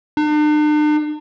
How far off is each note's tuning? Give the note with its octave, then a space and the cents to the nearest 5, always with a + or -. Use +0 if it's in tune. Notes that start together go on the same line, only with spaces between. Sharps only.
D4 +45